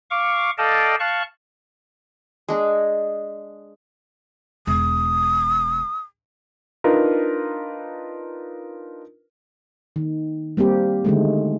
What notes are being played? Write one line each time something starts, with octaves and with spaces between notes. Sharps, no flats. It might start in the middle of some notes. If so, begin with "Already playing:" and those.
F5 C#6 D6
A4 D5 D#5 F5 G5 A5
F5 A5 C#6 F#6
G#3 D4
E1 D#6
D4 D#4 F4 A#4 B4
D#3
G3 A#3 C4 G4
D3 D#3 G#3 A3